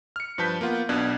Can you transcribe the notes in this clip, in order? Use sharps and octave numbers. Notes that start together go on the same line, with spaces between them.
F6 C#7
G2 F3 B4 A5 G6 B6
A#3 B3 F4 F#5
B1 B2 D4 D#6 F#6 G#6